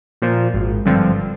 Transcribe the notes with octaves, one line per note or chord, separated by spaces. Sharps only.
A#2 F3
G#1
G2 D3 F3 C4